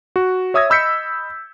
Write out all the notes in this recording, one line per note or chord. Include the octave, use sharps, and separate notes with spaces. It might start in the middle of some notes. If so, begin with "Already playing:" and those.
F#4
C#5 E5 D#6 E6 G#6 A#6
D#5 B5 E6 G6 B6 C#7